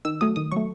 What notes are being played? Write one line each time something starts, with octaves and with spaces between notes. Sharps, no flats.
D#3 E6
F#3 A3 D#6
D#3 D#6
F#3 A3 C#6